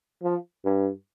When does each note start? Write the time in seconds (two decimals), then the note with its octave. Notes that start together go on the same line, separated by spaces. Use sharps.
0.23 F3
0.65 G2